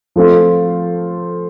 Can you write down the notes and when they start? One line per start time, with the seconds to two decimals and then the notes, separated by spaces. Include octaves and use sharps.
0.16 F3 A3 C4 F4